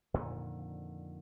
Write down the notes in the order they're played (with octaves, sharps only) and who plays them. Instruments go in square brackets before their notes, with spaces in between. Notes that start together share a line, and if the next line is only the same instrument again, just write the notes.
[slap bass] F2 A#2 D3 D#3